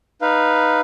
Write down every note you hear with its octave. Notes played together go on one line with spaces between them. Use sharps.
D#4 B4 F5